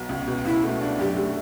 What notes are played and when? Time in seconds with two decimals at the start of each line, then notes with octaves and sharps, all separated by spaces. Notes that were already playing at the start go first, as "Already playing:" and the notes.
Already playing: B1 B2
0.09 C#2
0.28 B2
0.45 C#2 E4
0.64 A3
0.81 D4
0.99 F#2 G4
1.16 A3